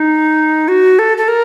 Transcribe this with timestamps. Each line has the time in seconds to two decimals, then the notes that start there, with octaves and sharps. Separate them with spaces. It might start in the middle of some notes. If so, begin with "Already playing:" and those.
Already playing: D#4
0.68 F#4
0.99 A4
1.17 A4
1.28 A#4